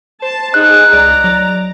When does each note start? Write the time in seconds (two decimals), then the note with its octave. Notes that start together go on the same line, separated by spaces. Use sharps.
0.22 C5 A5
0.54 D#4 G#4 F#6
0.93 C#2 D5 A#5
1.24 F#3 D5